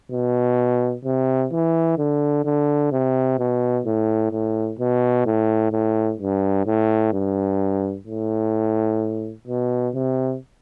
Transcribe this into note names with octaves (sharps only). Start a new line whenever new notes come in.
B2
C3
E3
D3
D3
C3
B2
A2
A2
B2
A2
A2
G2
A2
G2
A2
B2
C3